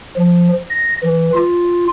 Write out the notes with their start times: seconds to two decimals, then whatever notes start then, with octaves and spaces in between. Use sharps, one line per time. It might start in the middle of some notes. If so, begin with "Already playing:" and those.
0.16 F3
0.70 A#6
1.03 E3
1.33 F4